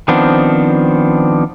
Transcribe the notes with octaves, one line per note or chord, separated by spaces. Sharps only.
D#3 F3 B3 C4 D4